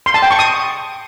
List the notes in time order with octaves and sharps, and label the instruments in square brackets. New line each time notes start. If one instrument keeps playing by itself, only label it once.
[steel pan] C6
A5
G5
C#6
D#6